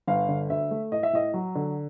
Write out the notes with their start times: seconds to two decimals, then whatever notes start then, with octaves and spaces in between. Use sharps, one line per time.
0.08 G1 F5
0.29 D3
0.50 D2 E5
0.71 A3
0.92 A2 D#5
1.03 E5
1.13 A2 D#5
1.34 F#3
1.55 D3